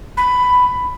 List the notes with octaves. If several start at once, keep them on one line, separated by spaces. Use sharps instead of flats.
B5